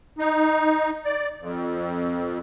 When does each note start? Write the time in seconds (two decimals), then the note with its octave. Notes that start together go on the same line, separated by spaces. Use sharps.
0.19 D#4
1.05 D5
1.40 F2